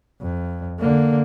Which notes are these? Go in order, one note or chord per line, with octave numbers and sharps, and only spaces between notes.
F2
D3 A#3